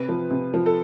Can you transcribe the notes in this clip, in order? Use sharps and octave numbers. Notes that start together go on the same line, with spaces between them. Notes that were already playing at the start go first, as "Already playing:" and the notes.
Already playing: C3 B4
F3
C3
F3
A4